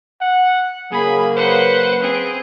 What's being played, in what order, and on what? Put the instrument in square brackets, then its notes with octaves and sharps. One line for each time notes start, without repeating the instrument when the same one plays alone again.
[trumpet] F#5
[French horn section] C#3 F#3 A#3 [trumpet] G#4 [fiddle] B5
[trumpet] B4 [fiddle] C5 F#5
[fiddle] C4 G#4